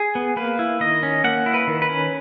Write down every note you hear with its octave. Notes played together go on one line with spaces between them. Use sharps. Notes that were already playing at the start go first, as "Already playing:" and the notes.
Already playing: G#4
B3
A#3 B4
E4
D#3 D#5
C#4
A#3 F#5
E4
B4
D#3
B4
C#4